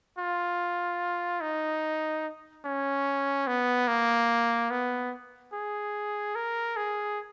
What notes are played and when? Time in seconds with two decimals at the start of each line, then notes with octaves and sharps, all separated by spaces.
0.18 F4
1.41 D#4
2.65 C#4
3.47 B3
3.87 A#3
4.70 B3
5.53 G#4
6.35 A#4
6.76 G#4